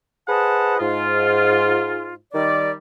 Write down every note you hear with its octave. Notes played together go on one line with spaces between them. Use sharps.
G#4 B4 C5 D#5 F#5 A5
G#2 F4
D#3 G3 D5